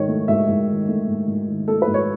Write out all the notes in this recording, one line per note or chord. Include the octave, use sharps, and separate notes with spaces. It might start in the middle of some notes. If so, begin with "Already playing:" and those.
Already playing: G#2 D#3 C#5
A3
G#2 E5
G#2
D#3
A3
G#2
G#2
D#3
A3 A4
B4
G#2
C#5